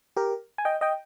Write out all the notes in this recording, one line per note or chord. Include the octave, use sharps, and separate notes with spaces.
G4 A#4
G#5
D#5 G5
D#5 G5